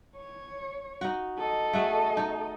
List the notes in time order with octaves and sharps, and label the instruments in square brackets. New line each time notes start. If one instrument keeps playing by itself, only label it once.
[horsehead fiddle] C#5
[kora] D#4 F#4
[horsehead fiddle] A4 D#5
[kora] A3 F#4 G#4
D#4